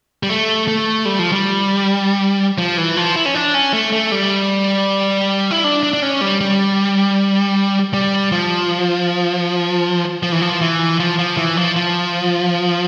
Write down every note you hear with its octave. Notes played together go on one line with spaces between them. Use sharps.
G3
A3
A3
G3
F3
G3
F3
E3
F3
E4
C#4
D4
C#4
A3
A3
G3
E4
D4
D4
D4
C#4
G3
G3
G3
F3
F3
E3
F3
E3
F3
F3
E3
F3
F3